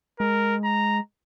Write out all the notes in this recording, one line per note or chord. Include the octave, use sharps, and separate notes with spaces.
G#3 A#4
A#5